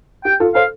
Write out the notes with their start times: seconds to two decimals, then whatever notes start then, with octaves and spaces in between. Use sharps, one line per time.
0.25 G4 G5
0.40 F4 A4
0.55 A4 C5 F5